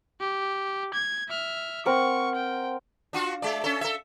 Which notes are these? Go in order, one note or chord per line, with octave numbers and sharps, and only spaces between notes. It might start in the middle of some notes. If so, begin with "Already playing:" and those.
G4
G#6
E5 F6
C4 A#4 F#5 C#6
G5
D4 F4 F#4
G#3 D5
C#4 A4
A4 E5